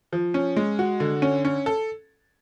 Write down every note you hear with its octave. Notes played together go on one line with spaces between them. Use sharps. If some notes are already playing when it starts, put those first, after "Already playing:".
F3
C#4
G#3
F#4
D3
C#4
C#4
A4